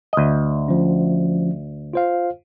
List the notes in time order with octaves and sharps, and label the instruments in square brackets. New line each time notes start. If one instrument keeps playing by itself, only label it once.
[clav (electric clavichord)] D2 D#5
[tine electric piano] F3 C#4
F4 C5 F5